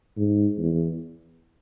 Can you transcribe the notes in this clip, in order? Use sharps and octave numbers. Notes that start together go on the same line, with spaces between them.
G#2
E2